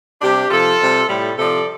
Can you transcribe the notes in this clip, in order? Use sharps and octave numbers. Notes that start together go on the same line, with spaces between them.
C3 G3 D4 G4
C3 F3 F4 A4
C3 G3
A2 G3
C3 F3 A4 D5